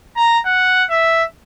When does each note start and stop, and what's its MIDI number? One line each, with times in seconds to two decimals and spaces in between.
0.17 0.39 82
0.46 0.83 78
0.90 1.23 76